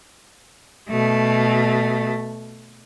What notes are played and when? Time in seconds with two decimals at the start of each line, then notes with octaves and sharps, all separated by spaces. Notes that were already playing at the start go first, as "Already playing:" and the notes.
0.89 B2 A3